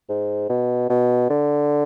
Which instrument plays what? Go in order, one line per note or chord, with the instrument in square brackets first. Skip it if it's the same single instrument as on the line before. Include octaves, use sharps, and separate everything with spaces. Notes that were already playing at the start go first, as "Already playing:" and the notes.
[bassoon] G#2
B2
B2
D3